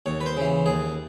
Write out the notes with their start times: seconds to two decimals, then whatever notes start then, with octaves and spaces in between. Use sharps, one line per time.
0.06 D#2 C#5
0.21 B4
0.26 C5
0.37 C#3 E3
0.66 D#2 G#4